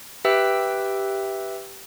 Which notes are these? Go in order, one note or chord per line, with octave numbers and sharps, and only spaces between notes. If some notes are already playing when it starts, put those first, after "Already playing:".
G4 B4 E5 G5 E6